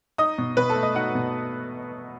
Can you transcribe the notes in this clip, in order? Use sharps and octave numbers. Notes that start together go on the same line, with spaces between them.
D#4 D#5 D#6
B2
B2 B4 B5
A4 A5
A3
D#5 D#6
D#4 F#4 F#5
B2